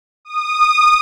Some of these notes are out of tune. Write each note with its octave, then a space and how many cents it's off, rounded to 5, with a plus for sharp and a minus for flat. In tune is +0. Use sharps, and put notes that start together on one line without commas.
D#6 -20